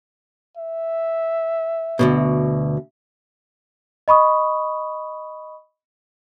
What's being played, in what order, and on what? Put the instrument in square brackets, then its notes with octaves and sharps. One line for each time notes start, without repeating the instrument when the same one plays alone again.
[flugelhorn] E5
[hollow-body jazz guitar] D2 G#2 B2
[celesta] D#5 B5 C#6 D#6